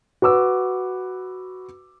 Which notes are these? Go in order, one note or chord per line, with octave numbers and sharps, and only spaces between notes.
F#4 B4 D6 E6